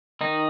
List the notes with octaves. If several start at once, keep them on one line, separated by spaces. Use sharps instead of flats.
D#3 D#4